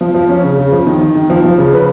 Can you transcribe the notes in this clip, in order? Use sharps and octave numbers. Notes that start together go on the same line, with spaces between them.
F3
F3
C#4
C#3
C#3
F3
D#3
D#3
D#3
F3
F3
C#3
B4